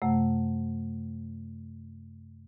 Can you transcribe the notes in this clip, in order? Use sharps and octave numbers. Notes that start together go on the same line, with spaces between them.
F#2 C3 A3 F#5